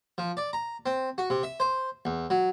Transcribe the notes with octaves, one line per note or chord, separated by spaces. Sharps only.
F3
D5
A#5
C4
F#4
C3
E5
C5
E2
F#3